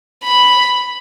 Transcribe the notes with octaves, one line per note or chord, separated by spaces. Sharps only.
B5